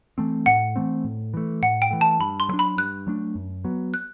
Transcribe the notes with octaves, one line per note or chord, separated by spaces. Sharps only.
E3 A3 C4
A2 F#5
E3 A3 C4
A2
E3 A3
A2 F#5
G5
E3 A3
A5
G2 B5
C6
F#3 A3 D4
B5
G2 F#6
F#3 A3 D4
F#2
F#3 B3
F#6